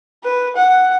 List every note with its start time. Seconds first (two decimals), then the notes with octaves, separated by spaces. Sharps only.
0.24 B4
0.56 F#5